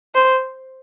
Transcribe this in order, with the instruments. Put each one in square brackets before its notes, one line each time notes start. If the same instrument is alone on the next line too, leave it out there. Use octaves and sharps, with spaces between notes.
[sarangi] C5